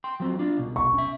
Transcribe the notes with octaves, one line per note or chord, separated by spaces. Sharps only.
G5 C6
F3 F#3 C4
D4 F4
C2 B2
C#6
C#4 E5